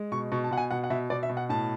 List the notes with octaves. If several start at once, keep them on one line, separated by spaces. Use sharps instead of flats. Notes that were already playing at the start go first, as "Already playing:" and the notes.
Already playing: G#3
B2 C#6
B2 C#6
A5
B2 F#5
G#5
B2 F#5
F#5
B2 E5
B2 D5
E5
B2
F#5
A2 A5